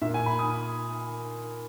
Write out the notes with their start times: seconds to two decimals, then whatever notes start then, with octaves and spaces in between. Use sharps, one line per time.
0.01 A#2 E5
0.14 G#5
0.26 B5
0.39 D#6